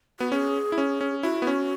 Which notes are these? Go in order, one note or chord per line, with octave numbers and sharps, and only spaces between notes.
B3 F#4
C#4 G#4
E4
C#4
C#4
E4 F#4
B3
C#4